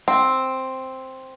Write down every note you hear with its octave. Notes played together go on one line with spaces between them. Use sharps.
C4